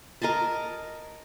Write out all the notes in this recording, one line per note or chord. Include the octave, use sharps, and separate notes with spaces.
A#4 D#5 G#5 A5